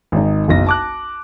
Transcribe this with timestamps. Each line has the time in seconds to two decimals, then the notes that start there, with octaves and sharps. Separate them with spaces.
0.12 G#1 D#4
0.48 F#1 B1 A#6
0.67 A5 D6 F#6